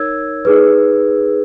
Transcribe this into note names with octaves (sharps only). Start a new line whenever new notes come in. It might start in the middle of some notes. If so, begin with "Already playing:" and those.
Already playing: D#4 A#4 C#5 E6 G#6
D#4 G#4 B4